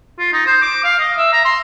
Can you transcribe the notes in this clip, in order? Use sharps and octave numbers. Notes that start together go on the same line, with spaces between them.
F4
D#4
C5
D6
F5
D#5
E5
A#5
C6